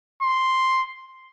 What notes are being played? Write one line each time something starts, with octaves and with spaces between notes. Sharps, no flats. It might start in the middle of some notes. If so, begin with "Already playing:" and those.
C6